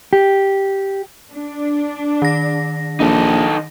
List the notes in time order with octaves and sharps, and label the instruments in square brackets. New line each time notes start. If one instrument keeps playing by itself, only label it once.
[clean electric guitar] G4
[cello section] D4
[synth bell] D#3 A#6
[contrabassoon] A#1 [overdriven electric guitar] D#4 A4